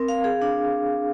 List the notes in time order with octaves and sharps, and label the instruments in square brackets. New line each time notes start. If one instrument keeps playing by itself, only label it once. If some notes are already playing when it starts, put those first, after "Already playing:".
Already playing: [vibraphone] C4 A#4
F5
G#4
D4